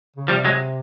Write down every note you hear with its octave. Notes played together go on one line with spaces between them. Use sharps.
C#3
C3 F3 G3
F#3 G#3